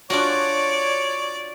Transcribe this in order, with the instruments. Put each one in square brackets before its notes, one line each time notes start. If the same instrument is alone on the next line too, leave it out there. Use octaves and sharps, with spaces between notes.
[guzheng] D4 F4 F#4 [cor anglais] C#5 [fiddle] D5